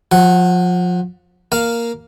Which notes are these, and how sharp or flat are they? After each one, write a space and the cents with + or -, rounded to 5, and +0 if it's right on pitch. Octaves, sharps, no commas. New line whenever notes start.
F3 +30 F#5 +0
A#3 +0 F5 +0